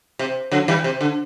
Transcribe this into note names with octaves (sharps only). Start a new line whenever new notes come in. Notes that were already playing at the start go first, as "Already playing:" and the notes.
C3
D3 F#3
E3 G3
C3
D3